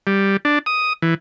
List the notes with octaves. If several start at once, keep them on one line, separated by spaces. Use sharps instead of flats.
G3
D4
D#6
E3